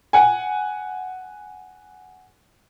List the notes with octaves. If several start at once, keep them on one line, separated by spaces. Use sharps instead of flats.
F#5 G#5